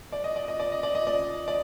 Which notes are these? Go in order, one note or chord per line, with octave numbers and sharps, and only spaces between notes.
D5
D#5
D5
D#5
D5
D#5
D5
D#5
D5
D5